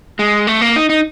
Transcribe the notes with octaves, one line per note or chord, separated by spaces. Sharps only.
G#3
A3
A#3
D#4
D#4